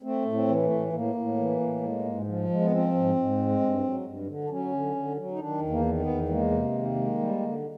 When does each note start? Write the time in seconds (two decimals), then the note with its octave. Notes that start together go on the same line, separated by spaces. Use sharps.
0.03 A3 C4
0.25 A2
0.33 C4
0.48 E3
0.63 A3
0.70 A2
0.93 A2 A#3
1.15 A2
1.37 E3
1.60 A2
1.82 G#3
2.05 G#2
2.27 F3
2.49 G#3
2.61 B3
2.71 F3 C4
2.94 G#2
3.15 G#2
3.38 G#3
3.61 G2
3.83 F#3
4.05 G2
4.27 D3
4.44 D4
4.50 F#3 C#4
4.72 D3
4.95 D3
5.17 F#3
5.31 D#4
5.39 D#3 D4
5.62 E2
5.70 A#3
5.85 D#3
5.99 B3
6.06 E2
6.29 G#3 A#3
6.51 C3
6.73 D#3
6.95 G#3
7.18 G3
7.40 D3